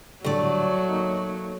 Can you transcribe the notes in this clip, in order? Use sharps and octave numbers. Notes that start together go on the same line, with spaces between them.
A2 D3 F#3 G3 A3 D5
A#3 D#4 C#5